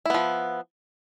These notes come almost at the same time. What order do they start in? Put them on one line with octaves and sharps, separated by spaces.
E4 B3 F3